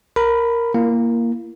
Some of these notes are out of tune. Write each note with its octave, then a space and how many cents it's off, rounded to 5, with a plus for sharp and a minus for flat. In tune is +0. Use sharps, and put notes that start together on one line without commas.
A#4 +0 B5 +10
A#3 +0 E4 +40